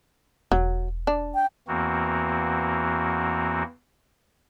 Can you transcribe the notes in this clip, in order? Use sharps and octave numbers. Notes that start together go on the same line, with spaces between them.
E1 F#3
D4
G5
E2 E3 A#3 C4 F#4